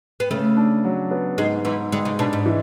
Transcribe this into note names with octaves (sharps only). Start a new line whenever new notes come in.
B3
C#3 A3
D4
F#3
B3
G#2 G#3
G#2 E3
D3 G#3
C#3
B2 D4
G#2
E3